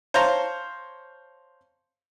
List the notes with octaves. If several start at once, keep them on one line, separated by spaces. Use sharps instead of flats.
C5 C#5 F5 A5 A#5